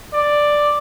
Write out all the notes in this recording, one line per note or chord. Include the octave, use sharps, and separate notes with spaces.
D5